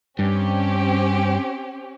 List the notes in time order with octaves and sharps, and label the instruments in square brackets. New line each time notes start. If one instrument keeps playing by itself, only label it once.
[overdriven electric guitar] G2 [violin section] C4 C#4 G4